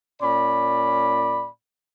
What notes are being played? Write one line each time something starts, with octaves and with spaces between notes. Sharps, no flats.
A#2 C#4 D5 B5